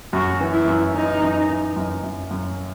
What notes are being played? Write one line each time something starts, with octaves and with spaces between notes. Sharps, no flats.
F#2 F#4
E3
E4
F#2
E3 D#4
F#2
E3
F#2
F#2
F#2